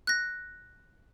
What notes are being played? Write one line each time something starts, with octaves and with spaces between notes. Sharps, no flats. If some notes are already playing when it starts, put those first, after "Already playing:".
F#6 A#6